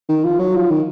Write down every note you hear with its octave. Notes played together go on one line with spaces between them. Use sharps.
D#3
F3
F#3
F3
D#3